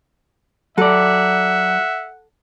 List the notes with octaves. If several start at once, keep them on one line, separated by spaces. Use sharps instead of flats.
F#3 A4 D5 E5 F#5